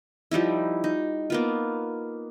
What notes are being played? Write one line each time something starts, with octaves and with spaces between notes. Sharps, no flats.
F3 G3 D#4 E4
D#4
A#3 B3 F4